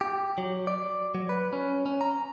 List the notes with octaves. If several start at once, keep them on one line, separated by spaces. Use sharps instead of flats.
G4
F#3
D5
F#3
B4
C#4
C#4
A#5